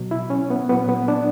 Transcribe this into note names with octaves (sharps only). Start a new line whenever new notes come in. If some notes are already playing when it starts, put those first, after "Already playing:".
Already playing: B2 F#3
E4
C#4
B3
A#2 F#3 B3
B3
D4